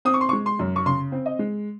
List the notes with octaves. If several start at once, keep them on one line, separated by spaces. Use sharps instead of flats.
C4 D#6
C#6
C6
C#6
G#3
C6
F#2
C#6
C#3 C6
C4
D#5
G#3